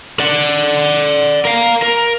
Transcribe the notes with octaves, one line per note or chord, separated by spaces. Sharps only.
D5 F#5
A#4 F5
A#4